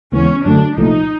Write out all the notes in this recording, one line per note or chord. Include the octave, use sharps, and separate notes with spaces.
D#2 C#3 E3 G#3 B3 C#4
F#2 D3 F#3 A3 D4
C2 A#2 F3 A3 D#4